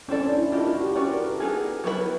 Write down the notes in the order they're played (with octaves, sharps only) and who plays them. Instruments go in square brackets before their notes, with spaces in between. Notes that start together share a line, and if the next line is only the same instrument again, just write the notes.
[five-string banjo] C4 E4 A4 D5 [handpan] C#4
[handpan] D4
E4
[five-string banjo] D4 G4 A#4 D#5 [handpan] F4
[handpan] F#4
G4
[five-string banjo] C#4 F#4 B4 D5
[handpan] A#4
A4
[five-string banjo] B3 D#4 G#4
F#3 B3 E4 G#4 B4